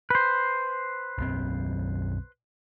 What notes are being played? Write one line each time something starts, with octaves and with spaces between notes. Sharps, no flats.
B4 C5
B1 F#2 C4